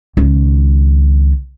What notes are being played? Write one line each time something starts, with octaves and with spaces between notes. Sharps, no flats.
C#2 D#3